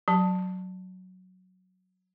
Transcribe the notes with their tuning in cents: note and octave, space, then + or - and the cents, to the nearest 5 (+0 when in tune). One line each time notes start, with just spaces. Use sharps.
F#3 +0 A5 +10